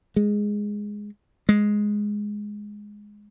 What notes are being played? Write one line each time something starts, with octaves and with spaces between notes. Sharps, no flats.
G#3
G#3